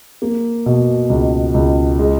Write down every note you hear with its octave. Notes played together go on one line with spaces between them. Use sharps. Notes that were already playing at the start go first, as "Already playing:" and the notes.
A#3
B2
C#2
C#2
G#3